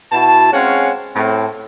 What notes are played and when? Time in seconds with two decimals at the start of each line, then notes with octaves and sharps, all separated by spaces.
0.12 B2 E4 F#4 A5
0.53 G#3 C4 C#4 C#5 F5 F#5
1.15 A2 C4